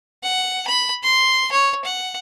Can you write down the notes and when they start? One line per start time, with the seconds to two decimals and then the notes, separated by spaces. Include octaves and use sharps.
0.23 F#5
0.67 B5
1.03 C6
1.52 C#5
1.85 F#5